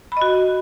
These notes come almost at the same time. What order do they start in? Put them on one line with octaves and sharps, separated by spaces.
B5 D#5 F#4